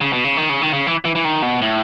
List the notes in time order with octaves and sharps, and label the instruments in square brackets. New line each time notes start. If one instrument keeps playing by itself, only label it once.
[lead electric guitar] C#3
B2
C#3
D#3
C#3
D#3
C#3
E3
E3
E3
D#3
B2
A2